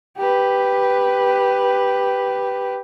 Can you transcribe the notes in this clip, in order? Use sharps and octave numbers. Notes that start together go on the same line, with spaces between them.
G4 B4